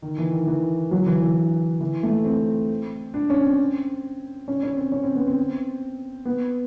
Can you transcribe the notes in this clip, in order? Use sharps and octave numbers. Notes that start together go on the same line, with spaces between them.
D#3
E3
D#3
E3
F#3
E3
E3
E3
A3
C4
D4
C#4
C4
C#4
C#4
C4
C#4
C4
B3
C4
B3